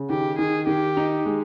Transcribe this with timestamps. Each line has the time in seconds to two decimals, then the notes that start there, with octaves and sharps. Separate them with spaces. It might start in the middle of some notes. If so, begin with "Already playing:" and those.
Already playing: C#3
0.10 D#3 G4
0.39 D#3 G#4
0.67 D#3 G4
0.97 D#4
1.25 G#3